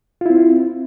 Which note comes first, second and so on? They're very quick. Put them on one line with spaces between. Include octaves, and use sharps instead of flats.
F4 E4 C4